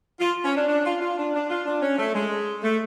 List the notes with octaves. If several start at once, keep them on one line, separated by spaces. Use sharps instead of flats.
F4
C#4
D4
D4
F4
F4
D4
D4
F4
D4
C#4
A3
G#3
A3